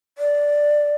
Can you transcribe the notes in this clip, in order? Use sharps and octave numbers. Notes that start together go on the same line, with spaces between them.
D5